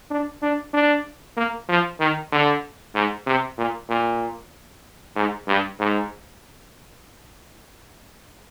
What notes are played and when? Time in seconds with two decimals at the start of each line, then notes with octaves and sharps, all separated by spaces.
0.11 D4
0.42 D4
0.74 D4
1.37 A#3
1.69 F3
2.00 D#3
2.32 D3
2.95 G#2
3.26 C3
3.58 A#2
3.89 A#2
5.16 G#2
5.48 G2
5.79 G#2